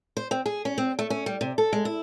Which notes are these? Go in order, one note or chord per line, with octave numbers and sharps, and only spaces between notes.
C5
C4
G#4
C#4
C4
A3
C#4
G3
C3
A4
G#3
E4